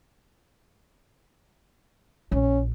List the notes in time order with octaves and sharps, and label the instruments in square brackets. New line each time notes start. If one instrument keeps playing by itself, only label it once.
[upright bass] A#1 [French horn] C#4